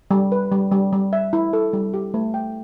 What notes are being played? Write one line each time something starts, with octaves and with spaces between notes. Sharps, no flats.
G3
B4
G3
G3
G3
E5
E4
A4
G3
G4
A3
G5